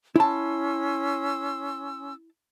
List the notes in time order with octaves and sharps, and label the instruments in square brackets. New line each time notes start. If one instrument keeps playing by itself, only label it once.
[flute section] C#4 C6 E6 [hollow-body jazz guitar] E4 A5